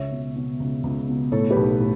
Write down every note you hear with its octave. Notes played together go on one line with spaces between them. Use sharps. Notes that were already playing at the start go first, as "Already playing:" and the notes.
Already playing: C#2 C#5 E5
B2
B2
C#2
C#2
B2
A2 A4 C#5
G4 B4
B1
A2